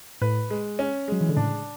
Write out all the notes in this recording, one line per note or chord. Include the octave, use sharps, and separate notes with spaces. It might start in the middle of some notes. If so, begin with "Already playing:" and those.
A2 B4
G#3
C#4
F#3 G#3
E3
D3
A2 C#3 D4